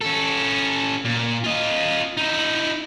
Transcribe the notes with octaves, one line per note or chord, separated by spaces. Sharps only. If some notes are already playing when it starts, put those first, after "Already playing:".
C#4 A4
A#2
F4 D#5
D#4 E4